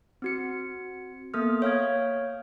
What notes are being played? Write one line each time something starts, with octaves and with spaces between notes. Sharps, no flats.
C4 F#4 C#7
A#3 B3 A4 D#6 F6
C#5 F5 F6 G#6